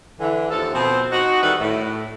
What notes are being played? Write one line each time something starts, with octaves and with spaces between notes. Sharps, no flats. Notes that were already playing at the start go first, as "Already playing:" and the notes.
D3 E3
D#2 F3 A4
B2 F3 C4
D#4 F#4
D#3 E3 G3 A4 B4
A2